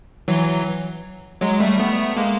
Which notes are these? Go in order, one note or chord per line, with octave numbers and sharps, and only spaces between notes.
E3 F#3
F#3 G#3
G3 A3
A3 B3
G#3 A#3